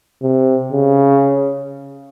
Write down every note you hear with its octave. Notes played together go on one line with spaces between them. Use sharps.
C3
C#3